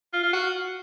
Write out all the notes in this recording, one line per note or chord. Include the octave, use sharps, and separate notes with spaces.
F4
F4
F#4